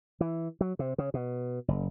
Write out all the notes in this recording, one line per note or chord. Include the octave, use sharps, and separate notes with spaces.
E3
F#3
C3
C#3
B2
F#1